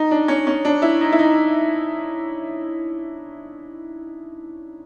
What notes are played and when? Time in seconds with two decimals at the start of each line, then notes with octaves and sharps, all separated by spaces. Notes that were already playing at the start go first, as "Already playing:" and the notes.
Already playing: D#4
0.11 D4
0.28 C#4
0.47 C#4
0.65 D4
0.82 E4
1.01 D#4
1.12 E4
1.19 D#4